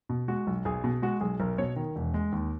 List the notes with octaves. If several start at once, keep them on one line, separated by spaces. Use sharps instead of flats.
B2
G#3 F#4
B1
B1 G#4
B2
G#3 F#4
B1 G#4
B1 A#4
B2 C#5
D#3
E1
G#3
D#2